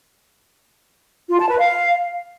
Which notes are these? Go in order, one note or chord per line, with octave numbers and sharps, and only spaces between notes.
F4
A5
B4
F5